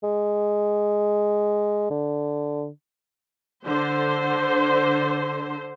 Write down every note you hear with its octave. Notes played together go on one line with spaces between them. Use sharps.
G#3
D3
D3 C5